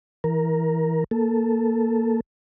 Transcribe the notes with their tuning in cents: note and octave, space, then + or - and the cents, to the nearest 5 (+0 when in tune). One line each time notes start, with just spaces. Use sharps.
E3 -10 A#4 +10
A#3 +0 A4 +0